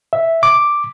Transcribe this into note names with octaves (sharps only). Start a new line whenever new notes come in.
E5
D6